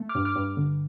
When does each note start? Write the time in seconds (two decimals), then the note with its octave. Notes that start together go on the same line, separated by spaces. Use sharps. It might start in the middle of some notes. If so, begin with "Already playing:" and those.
Already playing: A3
0.09 D6 F6
0.15 G2
0.25 D6 F6
0.36 G2
0.57 D3